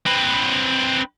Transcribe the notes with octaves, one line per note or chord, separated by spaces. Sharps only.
C4 B4